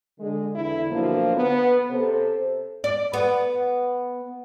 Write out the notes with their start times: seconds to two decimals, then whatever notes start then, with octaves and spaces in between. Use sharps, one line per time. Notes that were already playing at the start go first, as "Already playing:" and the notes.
0.20 D3 G#3
0.55 E2 D3 E4
0.91 B2 D3 F3 F#3 A#3
1.36 B3
1.90 C3 A4 C5
2.84 D5
3.13 B3